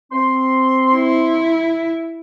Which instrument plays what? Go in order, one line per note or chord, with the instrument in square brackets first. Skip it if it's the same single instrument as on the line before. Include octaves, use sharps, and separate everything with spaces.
[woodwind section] C4 C6
[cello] E4